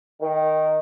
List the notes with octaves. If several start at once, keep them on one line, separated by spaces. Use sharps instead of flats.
D#3